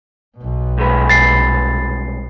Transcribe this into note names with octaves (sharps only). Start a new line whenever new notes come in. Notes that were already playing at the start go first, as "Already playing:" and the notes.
B1 B2
C2 G#3 B4
A6 C7